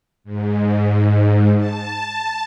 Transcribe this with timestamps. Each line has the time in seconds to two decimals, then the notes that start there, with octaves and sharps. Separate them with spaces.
0.24 G#2
1.57 A5